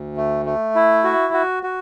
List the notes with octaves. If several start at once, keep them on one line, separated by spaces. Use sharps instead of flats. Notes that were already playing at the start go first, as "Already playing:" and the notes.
Already playing: D2
A3
A3
E4
F#4
F#4
F#4